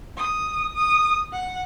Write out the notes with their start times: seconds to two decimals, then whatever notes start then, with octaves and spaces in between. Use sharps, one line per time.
0.17 D#6
0.75 D#6
1.32 F#5